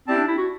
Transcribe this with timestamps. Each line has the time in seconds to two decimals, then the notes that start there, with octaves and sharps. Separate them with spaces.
0.08 C4 E4 G4 D5 A5
0.17 D4
0.28 E4
0.38 F#4